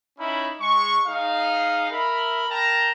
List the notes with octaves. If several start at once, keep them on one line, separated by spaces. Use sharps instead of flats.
C#4 D#4 E4 E5 B5
G#3 C#6
D#4 G#4 F5
A#4 E5 B5
A#4 G5 A5 A#5